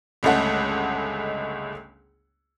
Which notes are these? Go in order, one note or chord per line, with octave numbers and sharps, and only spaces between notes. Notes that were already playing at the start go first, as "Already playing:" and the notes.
G1 C#2 G#3 A3 F#5